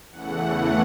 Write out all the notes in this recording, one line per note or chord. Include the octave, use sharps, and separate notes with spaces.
E2 C#3 E3 A3 F#5
F#5